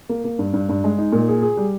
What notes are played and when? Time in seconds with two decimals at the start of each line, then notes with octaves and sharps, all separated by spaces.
0.09 A#3
0.24 A#3
0.39 G2
0.54 G2
0.69 G2
0.84 G#3
0.98 D#4
1.12 A#2
1.28 G#4
1.42 G#4
1.57 G3